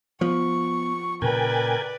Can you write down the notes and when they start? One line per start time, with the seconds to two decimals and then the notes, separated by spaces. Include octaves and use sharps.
0.21 F3 B3 C#6
1.22 A#2 C#3 A#4 B4 D5 G5 G#5